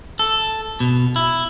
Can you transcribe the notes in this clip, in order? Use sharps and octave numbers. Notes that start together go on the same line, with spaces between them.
A4
B2
E4